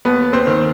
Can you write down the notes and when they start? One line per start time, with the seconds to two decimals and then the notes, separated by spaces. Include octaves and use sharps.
0.05 D#2 B3 B4
0.33 C4 C5
0.47 D#3